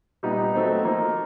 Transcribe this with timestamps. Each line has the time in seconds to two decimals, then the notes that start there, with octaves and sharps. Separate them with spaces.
0.23 A#2 G3 B3 D#4
0.54 F#3 A3 C4 D#4
0.84 F3 A#3 D#4